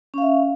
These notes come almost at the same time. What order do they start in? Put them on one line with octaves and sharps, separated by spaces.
C#4 F5 E5